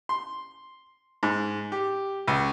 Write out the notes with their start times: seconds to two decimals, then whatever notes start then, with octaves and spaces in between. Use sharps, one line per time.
0.09 C6
1.23 G#2
1.72 G4
2.28 C#2